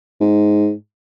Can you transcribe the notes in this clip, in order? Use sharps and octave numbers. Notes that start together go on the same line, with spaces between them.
G#2